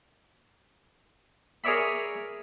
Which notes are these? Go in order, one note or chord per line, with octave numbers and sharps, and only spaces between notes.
G#4 A#4 C#5 D5 E5 B5